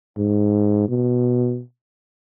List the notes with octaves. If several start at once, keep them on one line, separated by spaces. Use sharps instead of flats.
G#2
B2